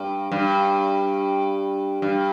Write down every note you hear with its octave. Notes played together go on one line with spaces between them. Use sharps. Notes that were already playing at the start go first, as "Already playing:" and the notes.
Already playing: G2
G2
G2